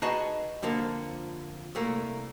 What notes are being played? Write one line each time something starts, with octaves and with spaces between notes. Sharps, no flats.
D#4 F#4 G#4 B4 D#5 A5
F2 D3 F3 A#3
C2 A3 A#3